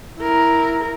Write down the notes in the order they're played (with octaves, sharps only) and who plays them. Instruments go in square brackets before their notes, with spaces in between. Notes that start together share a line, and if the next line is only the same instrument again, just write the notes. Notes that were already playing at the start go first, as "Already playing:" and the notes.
[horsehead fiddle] E4 A#4